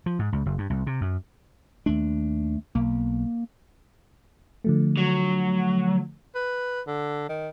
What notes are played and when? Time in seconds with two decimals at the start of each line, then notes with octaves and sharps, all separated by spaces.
0.06 F3
0.19 G#2
0.33 C#2
0.46 F#1
0.58 G2
0.70 C2
0.87 C3
1.01 F#2
1.86 D#2 A3 D4
2.75 B1 A#3
4.64 D3 F3 A3
4.97 F#3
6.35 B4
6.87 D3
7.29 D#3